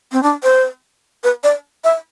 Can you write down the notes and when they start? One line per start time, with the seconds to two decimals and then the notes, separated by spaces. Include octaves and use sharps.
0.12 C4
0.23 D4
0.43 C5
1.24 B4
1.43 D5
1.84 E5